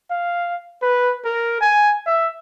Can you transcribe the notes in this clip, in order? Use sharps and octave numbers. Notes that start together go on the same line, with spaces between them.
F5
B4
A#4
G#5
E5